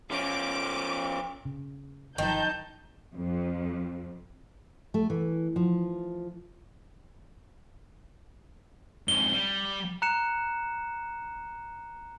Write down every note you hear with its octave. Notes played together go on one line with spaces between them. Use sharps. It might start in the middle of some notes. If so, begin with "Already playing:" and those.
F3 C#4 D6
C#3
G1 D#3 F3 F#3 D#4 A5 G6
F2
A3
E3
F3
F2 G#2 G7
G3
A#5 F#6 C#7 E7